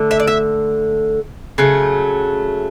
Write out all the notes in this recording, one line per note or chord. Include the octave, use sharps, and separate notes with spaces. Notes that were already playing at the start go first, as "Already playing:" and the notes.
Already playing: D3 A3
E5
D5
E5
C#3 F#3 A3